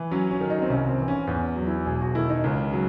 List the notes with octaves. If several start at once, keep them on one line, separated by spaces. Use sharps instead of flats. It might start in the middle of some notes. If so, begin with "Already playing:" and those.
Already playing: E3
F#3 C#4
C#4
D#3
D#4
C4
C2 C#4
C4
E3
C#4
E2 C#4
F#3
E4
E1 G#4
F#4
D#3 E4
D#4
C#2 C#4
F#3